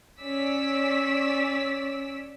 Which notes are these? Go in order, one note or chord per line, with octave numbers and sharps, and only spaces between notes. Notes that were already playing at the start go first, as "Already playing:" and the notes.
C#4 D5 E6 B6